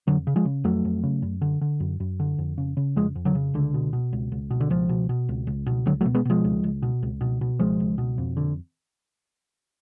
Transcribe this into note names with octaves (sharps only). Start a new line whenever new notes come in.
F2 D3 F#3
C#3
F3 G#3
C#3
F2 F#3 A3
F2
C#3
F#2
D3
D3
F#2
F#2
D3
F2
C#3
C#3
F2 F3 G#3
F2
D3 F#3
C#3
C#2 D3
B2
B2
C#2
C#2
B2
D3
C#2 F3
B2
B2
C#2
C#2
B2
C#2 D3 F#3
F#3 A3
B2
G#3 B3
B2 F3 G#3
C#2
C#2
B2
C#2
B2
B2
C#2 F3 G#3
C#2
B2
F2
D3